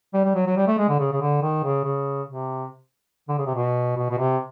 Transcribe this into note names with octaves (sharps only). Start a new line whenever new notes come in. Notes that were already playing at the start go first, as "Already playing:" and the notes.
G3
G3
F#3
F#3
G3
A3
G#3
D3
C#3
C#3
D3
D#3
C#3
C#3
C3
D3
C#3
C3
B2
B2
B2
C3